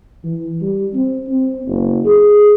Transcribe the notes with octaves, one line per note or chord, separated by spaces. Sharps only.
E3
G3
C4
C4
F#1
G#4